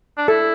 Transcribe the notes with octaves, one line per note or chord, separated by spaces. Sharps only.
D4
E4 A4